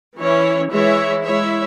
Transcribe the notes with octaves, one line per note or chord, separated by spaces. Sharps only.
E3 C#4 E4 C#5
E3 G#3 E4 C#5 E5
G#3 E4 C#5 E5